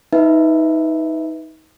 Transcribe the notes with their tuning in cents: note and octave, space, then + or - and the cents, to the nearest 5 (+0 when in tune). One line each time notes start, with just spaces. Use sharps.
D#4 +25 B4 +0 E5 +0